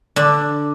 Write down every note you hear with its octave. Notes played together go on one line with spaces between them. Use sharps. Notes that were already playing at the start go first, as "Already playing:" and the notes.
D3 D4